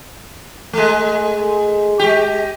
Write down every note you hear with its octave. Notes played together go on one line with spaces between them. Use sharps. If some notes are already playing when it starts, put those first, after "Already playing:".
G#3 A3
G#3 G4